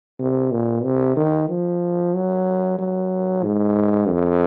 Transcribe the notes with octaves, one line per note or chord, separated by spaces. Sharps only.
C3
A#2
C3
D#3
F3
F#3
F#3
G#2
F2